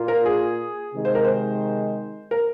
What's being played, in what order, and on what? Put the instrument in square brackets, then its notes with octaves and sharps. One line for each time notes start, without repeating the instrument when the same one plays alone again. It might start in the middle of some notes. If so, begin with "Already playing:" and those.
Already playing: [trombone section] A#2 A#3 F4
[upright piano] A#4
G#4
[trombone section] C3 D#3 G#3
[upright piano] C5
A#4
C5
A#4